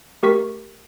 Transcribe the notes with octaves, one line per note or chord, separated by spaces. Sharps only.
A3 G4 A#4 C#6 B6